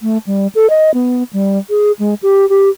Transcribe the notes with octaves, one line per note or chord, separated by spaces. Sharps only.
A3
G3
A4
D#5
B3
G3
G#4
G#3
G4
G4